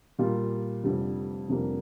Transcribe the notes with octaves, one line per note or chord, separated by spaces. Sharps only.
A#2 G3 A#3 F4
F1 F2 D3 G3
F1 F2 D3 G3 A#3